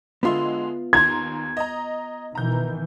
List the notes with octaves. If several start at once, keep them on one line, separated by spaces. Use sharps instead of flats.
D3 G#3 B3 F4 E5 C6
D#2 A#5 C6 G#6
D#5 A#5
B2 D#3 E3 A#5 G6